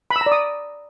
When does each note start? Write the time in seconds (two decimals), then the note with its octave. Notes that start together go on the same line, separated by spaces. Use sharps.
0.10 B5
0.16 E6
0.21 A#5
0.26 D5
0.32 D#6